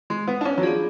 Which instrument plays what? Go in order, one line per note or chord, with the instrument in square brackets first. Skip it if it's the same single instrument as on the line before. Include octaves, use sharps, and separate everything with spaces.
[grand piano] G#3
B3
D4
C#4
F#3
[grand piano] F3 [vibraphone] B3 D4 G#4 D5